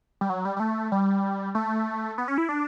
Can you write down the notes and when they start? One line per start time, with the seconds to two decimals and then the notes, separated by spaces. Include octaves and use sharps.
0.21 G3
0.30 F#3
0.45 G3
0.57 G3
0.60 A3
0.92 G3
1.55 A3
2.18 B3
2.28 C#4
2.38 E4
2.49 D4